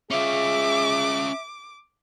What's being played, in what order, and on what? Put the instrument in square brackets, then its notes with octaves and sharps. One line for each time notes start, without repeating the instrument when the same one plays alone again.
[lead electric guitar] C#4 F4 [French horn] G#4 [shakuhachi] E5 [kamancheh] D6